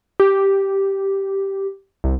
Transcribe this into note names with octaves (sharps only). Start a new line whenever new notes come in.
G4
C2